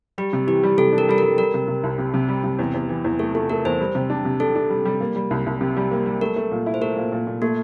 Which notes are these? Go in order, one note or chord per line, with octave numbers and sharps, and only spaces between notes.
G3 G4
C3
E3 G4
G3
C3 A4
D4
A#4
G3 A4
A#4
G3
G3 A#4
C3
C3
C2
C3
C3
G3
C3
E2
E2
E3
E2
A3 A4
A3 F4
A3 A#4
E2 C5
G3
C3
D4
C3
D4 A4
D4
G3
G3
A#3
G3
C2
C2
C3
G3
A#3
G3
A3 A#4
A3
A#2
E4
C5
A3 A#4
A#2
A#2
A#2
A3 A#3